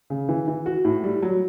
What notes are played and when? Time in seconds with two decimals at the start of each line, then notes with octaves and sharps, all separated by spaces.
0.10 C#3
0.29 E3
0.48 E3
0.66 F#4
0.85 A2
1.04 G3
1.22 F#3